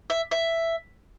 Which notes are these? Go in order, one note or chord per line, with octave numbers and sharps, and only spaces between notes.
E5
E5